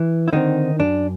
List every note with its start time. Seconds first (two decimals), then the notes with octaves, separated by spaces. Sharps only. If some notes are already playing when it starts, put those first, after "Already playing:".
Already playing: E3
0.28 E4
0.33 D3 D#3 G3 C4 D#4
0.79 F#2 D4